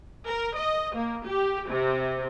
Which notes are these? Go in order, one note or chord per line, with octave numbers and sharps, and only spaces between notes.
A#4
D#5
A#3
G4
C3